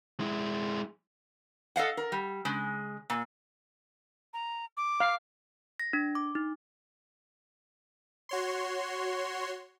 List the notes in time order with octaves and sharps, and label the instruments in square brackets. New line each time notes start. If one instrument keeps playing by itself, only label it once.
[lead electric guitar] G#3 E4
[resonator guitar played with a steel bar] A4 D#5 F5 F#5
A#4
G3
C#3 G#3
A#2
[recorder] A#5
D6
[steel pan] F5
[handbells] A#6
D4
D6
D#4
[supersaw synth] F#4 C#5 C6